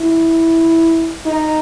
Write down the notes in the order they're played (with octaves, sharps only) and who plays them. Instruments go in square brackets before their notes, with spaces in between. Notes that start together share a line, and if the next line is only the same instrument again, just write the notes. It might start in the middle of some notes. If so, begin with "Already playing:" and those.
Already playing: [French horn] E4
D#4